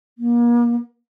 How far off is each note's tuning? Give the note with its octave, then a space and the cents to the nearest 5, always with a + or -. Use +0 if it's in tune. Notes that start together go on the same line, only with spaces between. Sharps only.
A#3 +35